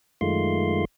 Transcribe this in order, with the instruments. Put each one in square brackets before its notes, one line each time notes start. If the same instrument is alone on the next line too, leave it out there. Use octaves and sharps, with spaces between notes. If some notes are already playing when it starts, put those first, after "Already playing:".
[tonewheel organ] F#2 D#3 G#3 A3 F4 C6